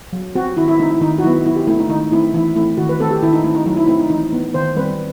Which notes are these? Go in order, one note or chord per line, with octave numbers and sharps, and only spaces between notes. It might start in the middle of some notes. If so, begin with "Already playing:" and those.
F#3
C4 F#4
D#3 E4
E4
A3 C4 D#4
E4
D#3 D#4
F#4
F#3 B3 E4
F#3 E4
G4
A3 C4 E4
D#4
D#3 D#4
A3 C4 E4
E3 E4
A3 C4 E4
D#3 F#4
B4
A3 C4 A4
G4
D#3 E4
D#4
A3 C4 E4
D#4
F#3 D#4
E4
A3 C4 E4
D#4
E3 D#4
B3
D#3 C5
G3 C4 B4